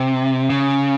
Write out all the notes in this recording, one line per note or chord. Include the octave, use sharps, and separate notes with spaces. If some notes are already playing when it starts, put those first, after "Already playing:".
Already playing: C3
C#3